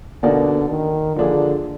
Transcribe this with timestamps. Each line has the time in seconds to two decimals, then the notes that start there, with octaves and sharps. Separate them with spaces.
0.23 B2 D3 A#3 D#4 F#4 D5
0.69 D#3
1.16 D3 F3 A#3 D4 G#4